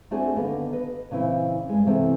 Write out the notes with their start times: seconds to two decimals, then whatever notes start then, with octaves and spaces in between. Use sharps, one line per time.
0.11 A3 C4 D4 F#4 G#4 G#5
0.36 D3 D#3 A#3 B3
0.72 B4 D#5
1.11 A#2 C#3 E3 C4 E4
1.69 G2 G#3
1.87 C3 E3 A3 B3 C4